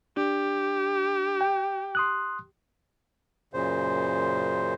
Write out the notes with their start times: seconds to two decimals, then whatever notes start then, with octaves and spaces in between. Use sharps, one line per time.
0.17 D4 G4
1.41 G5
1.95 C6 D#6 F#6
3.54 F#2 A#2 C#3 C5